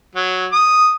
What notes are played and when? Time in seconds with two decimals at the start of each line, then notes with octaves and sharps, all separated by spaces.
0.15 F#3
0.52 D#6